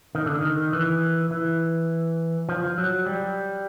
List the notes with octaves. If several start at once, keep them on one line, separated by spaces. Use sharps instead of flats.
D#3
D3
D#3
E3
E3
F3
F#3
G3